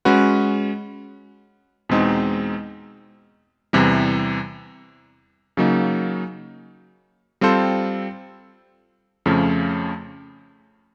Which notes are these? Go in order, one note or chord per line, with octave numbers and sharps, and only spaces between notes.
G#3 C#4 F#4 B4
E2 B2 G#3 C4 D#4
E2 C3 E3 G3
C#3 F#3 A#3 D#4
G3 C4 F4 A4 C5
F2 C#3 F3 A3 C#4